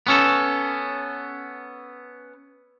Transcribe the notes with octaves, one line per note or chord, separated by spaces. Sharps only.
B3 C#4 A4